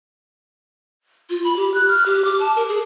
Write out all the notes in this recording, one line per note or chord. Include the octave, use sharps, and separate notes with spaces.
F4
B5
G4
F#6
F6
G4
D6
A5
A#4
G#4